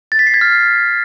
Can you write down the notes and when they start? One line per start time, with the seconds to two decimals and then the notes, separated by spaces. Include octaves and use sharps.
0.12 A6
0.19 B6
0.27 C7
0.34 G#6
0.41 F6